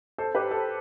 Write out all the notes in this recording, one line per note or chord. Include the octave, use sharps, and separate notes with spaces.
A4 C5
G4 B4
A4 C5